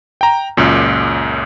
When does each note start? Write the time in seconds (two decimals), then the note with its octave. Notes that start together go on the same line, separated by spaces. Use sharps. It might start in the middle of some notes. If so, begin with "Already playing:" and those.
0.21 G5 A#5
0.57 C#2 F#2 A#2